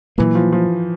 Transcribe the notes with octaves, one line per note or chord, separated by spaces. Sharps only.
A#2 E3 F#3 A#3
F3
F3